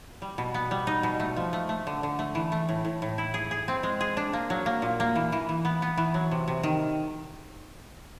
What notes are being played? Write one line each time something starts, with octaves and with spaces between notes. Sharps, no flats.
G3
B2
B3
G3
D#4
B2
A3
F3
A3
A3
D3
D3
A3
E3
A3
A2
A2
A2
E4
G#4
G#4
C4
G#3
G#4
D4
A#3
F#3
A#3
A#2
A#3
E3
E3
E3
B3
B3
E3
F#3
C3
C3
D#3